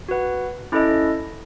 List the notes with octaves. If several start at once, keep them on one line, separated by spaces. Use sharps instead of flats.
F#4 B4 F#5
C#4 E4 A4 D#5